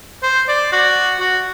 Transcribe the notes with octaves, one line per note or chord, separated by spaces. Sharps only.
C5
D5
F#4
F#4